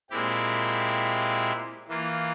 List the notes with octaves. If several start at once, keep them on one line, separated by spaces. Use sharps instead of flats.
A#2 G#3 C4 E4 G4
E3 A#3 F4